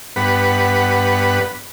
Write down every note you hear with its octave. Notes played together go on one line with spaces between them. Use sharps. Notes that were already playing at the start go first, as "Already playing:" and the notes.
G2 B3 B4 F#5